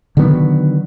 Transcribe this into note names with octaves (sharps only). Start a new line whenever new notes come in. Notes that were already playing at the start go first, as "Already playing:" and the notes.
D3 D#3 F#3 B3